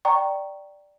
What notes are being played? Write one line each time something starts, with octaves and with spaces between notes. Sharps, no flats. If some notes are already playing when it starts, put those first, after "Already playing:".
D5 G5 A#5 C#6